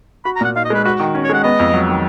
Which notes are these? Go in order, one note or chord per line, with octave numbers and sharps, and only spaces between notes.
F#4 B5
A#5
A#2 F#5
D#4 F5
D#5
G#3 B4
F#4 B4
D#3
C#4
C#5
G#3 F#5
B3 D#5
F2
F#3
D#3